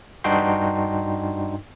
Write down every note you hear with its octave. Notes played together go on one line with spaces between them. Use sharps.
G2 D4 D#4 F#4 G5 C6